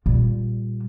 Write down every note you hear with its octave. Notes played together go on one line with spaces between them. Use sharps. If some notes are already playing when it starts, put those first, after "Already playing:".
A#2 G3